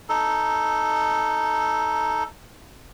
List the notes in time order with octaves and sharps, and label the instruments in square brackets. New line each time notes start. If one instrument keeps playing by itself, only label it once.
[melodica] D#4 A4